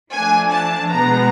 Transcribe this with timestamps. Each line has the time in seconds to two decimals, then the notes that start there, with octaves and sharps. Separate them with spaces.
0.13 F3 A3 D4 G#5
0.52 A5
0.90 B2 G#3 B3 A#5